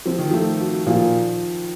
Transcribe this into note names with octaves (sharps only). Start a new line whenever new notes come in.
F3 C4
D#3
F3 A3
F#4
A#2 F3